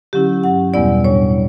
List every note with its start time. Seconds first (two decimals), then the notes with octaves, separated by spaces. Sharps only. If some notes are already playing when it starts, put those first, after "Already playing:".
0.13 D3 F#3 C#4 E4 G4
0.43 G2 F#3 C#4 F#5
0.74 E2 B2 G3 B3 E4 D5
1.04 A2 G3 D4 C#5